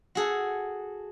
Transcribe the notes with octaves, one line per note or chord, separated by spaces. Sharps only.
F#4 G#4 A4